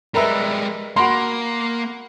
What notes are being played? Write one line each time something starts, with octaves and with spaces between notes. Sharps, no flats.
G3 G#3 A#4 B4 E5
A#3 F#4 B5 C6